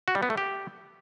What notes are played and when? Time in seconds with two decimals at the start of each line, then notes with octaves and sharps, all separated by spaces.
0.08 F#4
0.15 G3
0.23 B3
0.30 A3
0.37 G4